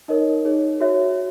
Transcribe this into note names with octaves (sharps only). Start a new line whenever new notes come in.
D#4 A#4 C#5 D#5
D#4 G#4 C#5
F#4 C#5 E5